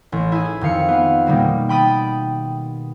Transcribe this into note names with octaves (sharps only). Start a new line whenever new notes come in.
A1
E4 G#4
F2 D#3 F5 C#7
B3 F5
B2 D#3 G3 A#3
G5 B5 D#6 A6